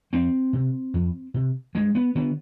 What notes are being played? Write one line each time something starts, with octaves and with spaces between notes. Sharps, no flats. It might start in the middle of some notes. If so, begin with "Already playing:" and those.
F2 C4
C3
F2
C3
G2 G#3
B3
D3 B3